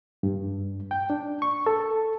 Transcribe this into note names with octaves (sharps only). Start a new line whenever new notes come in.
G2
G5
D4
C#6
A4